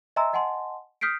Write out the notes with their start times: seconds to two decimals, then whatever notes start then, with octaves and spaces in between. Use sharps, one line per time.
0.16 D#5 E5 G#5 A#5 C6 E6
0.33 D#5 F#5 G#5 A5 C6
1.01 D#6 F6 G6 B6 C7 D7